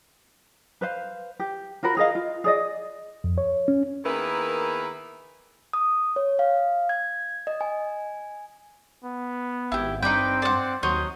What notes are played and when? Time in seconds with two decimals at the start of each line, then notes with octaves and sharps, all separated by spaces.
0.81 B4 C5 F5
1.40 G4
1.83 F4 F#4 A#4 B5
1.97 G#4 A#4 D#5 F5
2.15 F4
2.44 G#4 D5 D#5
3.24 F2
3.38 C#5
3.68 C#4
4.05 D#3 A#3 B3 E4 G#4 B4
5.73 D#6
6.16 C#5
6.39 F5
6.89 G#6
7.47 D#5
7.61 G#5
9.04 B3
9.72 G#1 E4 G4
10.02 G2 C4 D#4 B4 D5 G5 B5
10.42 C5 D5 F#5 D6
10.83 D#2 F#3 C5 C#5 D#5